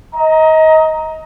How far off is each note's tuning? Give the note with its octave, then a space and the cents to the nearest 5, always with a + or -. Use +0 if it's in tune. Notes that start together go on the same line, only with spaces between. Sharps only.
D#5 +25 A#5 +0